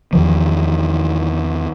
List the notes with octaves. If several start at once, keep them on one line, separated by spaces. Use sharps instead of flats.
E2 D#3 F3